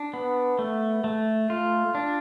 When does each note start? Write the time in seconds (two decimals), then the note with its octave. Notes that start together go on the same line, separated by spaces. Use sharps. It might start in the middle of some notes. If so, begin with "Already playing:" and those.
Already playing: D4
0.14 B3
0.59 A3
1.04 A3
1.50 F4
1.95 D4